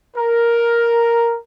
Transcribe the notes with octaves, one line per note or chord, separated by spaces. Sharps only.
A#4